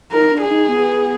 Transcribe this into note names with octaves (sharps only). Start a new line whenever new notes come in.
D#4 A#4
D4
G#4
D#4
B3